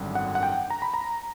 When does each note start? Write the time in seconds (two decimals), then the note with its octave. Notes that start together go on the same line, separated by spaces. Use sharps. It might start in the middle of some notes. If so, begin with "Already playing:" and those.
Already playing: G#1 F#2 D3 G3
0.15 F#5
0.35 F#5
0.43 G5
0.70 A#5
0.82 B5
0.94 A#5